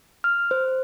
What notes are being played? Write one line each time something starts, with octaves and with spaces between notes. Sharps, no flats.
F6
C5